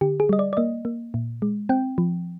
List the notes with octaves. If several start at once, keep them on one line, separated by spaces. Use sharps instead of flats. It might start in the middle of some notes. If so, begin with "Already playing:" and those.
D3 G4
G#4
G3 D#5
D5
D5
A#3 D#5
A#3
A#2
G#3
C4 G5
F3